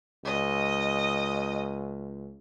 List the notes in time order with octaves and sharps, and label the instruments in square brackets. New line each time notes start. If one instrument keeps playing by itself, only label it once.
[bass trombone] C#2 [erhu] D#5